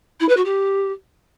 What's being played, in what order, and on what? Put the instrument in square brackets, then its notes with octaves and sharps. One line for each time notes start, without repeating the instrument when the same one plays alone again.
[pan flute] E4
B4
F#4
G4